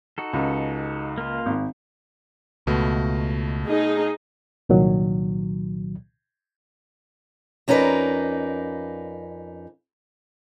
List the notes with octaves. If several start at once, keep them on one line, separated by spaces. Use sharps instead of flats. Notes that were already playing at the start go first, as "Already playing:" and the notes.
D#4 F#4 A4
C#2
A#3 F4
G#1
C#2 B2 A3
D#4 G#4
C2 A#2 D#3 F#3
F2 C#4 D#4 A#4 B4 D5